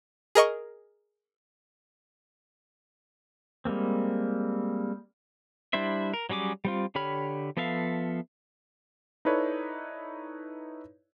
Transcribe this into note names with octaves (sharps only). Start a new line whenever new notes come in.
G#4 A#4 D#5 C#6
G3 G#3 A#3 C4
G3 D4 E4 C5 E5
A#4
F#3 G3 C#4 G#4 D6
G3 C4 F4
D3 G4 C#5 B5 F6
F3 B3 A4 E5 F5
D#4 E4 A4 B4 C#5 D5